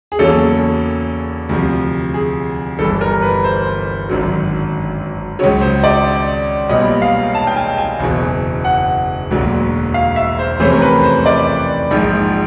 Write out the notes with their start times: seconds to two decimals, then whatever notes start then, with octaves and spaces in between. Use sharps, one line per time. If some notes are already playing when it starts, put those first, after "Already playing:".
0.12 G#4
0.19 E2 C#3 F#3 A#3 C#4 A4
1.49 D2 C3 F3
2.14 G#4
2.79 G1 G2 E3 A4
3.01 A#4
3.22 B4
3.44 C5
4.09 G#1 F#2 D3 F#3
5.39 C#2 C#3 F#3 C#5
5.61 C5
5.84 D5
6.69 B1 A#2 G3 B3 D#5
7.02 F5
7.35 A5
7.47 G5
7.56 G#5
7.78 G#5
8.00 F#1 E2 B2
8.65 F#5
9.30 E1 D2 D3 F#3 A#3
9.94 F5
10.16 E5
10.39 C5
10.60 F2 C3 E3 A3 C#4 C5
10.72 A#4
10.82 B4
11.03 C5
11.26 D5
11.91 A#1 G#2 F3